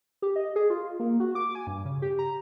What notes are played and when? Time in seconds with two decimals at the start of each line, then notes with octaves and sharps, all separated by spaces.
0.22 G4
0.36 D#5
0.56 G#4
0.70 F4
1.00 A#3
1.20 F#4
1.35 D6
1.55 G#5
1.67 G2
1.85 C#3
2.02 G4
2.19 A#5